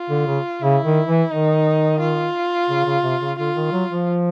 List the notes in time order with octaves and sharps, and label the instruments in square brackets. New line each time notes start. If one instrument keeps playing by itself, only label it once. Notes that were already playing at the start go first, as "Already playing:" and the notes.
Already playing: [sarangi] F4
[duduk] D3
C#3
[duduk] C#3 [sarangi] E4
[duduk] D#3
E3
[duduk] D#3 [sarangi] D#4
[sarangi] F4
[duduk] C#3
C#3
C3
C#3
[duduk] D3 [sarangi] F4
[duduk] D#3
F#3
F3